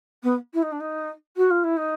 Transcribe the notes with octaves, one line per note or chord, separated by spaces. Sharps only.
B3
E4
D#4
D4
D#4
F#4
F4
E4
D#4